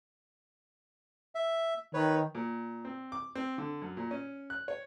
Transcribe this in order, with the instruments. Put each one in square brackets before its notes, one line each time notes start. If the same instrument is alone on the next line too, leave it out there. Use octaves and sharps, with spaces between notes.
[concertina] E5
[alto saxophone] D#3 [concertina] B4 C#5
[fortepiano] A#2
C4
D6
C4
D3
F#2
A#2
C#4
F#6
C#5